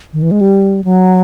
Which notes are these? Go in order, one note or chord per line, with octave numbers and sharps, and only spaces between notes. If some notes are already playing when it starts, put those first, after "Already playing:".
D#3
E3
G#3
G3
F#3